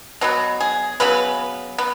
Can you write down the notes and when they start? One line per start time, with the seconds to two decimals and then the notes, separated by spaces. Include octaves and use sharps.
0.21 B2 F#3 B3 F#4
0.60 G#4
1.00 C#3 F#3 B3 B4
1.78 B3